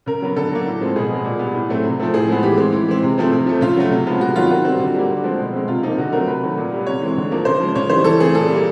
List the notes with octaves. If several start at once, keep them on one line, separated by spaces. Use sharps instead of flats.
C#3 A#4
F#3 B3
D3 A4
F#3 A#3
A2
F3 G#3 C4
B2 G#4
G#3 B3
A#2
G3 B3
A2
F#3 A3 C4
C3
F3 A3 C4
A2 G#4
F3 G#3 B3
E3 G4
G#3 C4
E3
G#3 C4
C3
F3 A3 C4
C3
F3 A3
C#3 F4
F#3 A3
C3
F3 G#3 B3
C3 F#4
D#3 F#3 B3 F4
D#3 F#4
G3 C4
D3
G3 A#3
D3
F3 G#3 C4
B2
G#3 C4
C3 F4
F3 A#3 D#4
D3 F#4
F#3 A3 C4 A#4
C3 B4
D#3 F#3 A3
A#2
G3 B3
C3 C#5
E3 G#3 C4
D3
F3 A#3
C#3 C5
F3 G#3
C#3 C#5
E3 G3 C5
E3 A4
A3 C4 G#4
A#2 A4
G3 A#3